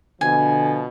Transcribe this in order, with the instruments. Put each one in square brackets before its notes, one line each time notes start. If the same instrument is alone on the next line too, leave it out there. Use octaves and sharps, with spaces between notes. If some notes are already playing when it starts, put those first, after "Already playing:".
[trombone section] B2 F3 [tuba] D3 [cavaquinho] G#5